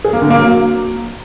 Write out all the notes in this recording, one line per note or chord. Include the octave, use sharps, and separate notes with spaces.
G#4
A#3
D3
A#3
F#3